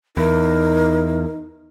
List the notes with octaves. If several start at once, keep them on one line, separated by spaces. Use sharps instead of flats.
E2 D#4 A#4